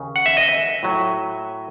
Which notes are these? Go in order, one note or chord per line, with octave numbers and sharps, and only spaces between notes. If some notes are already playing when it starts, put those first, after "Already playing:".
Already playing: D#2 C#3
F#5
E5
D#5
E5
A2 F#3 A3